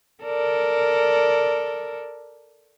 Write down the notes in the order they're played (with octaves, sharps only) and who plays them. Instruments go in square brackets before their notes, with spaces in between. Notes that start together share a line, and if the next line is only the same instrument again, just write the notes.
[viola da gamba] A4 A#4 D5